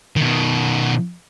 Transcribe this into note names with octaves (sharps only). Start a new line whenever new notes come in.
B2 D#3